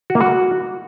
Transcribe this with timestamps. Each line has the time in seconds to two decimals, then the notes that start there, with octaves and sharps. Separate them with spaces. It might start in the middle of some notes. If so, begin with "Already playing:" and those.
0.10 F#4
0.15 A#3
0.21 F#4